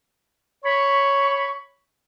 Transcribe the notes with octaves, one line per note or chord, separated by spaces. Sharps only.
C#5 B5 C#6